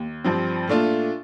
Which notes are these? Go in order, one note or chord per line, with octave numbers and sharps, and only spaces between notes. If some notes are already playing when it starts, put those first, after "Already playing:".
Already playing: D#2
G2 F3 C4
A#2 A3 D4 F4